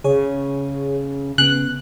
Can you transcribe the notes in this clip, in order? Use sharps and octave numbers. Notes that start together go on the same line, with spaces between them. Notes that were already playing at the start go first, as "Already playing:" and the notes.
C#3 G#4 C#5
C#3 B3 F#6